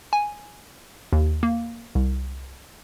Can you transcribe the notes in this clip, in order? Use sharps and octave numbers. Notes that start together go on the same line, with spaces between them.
G#5
D#2
A#3
C2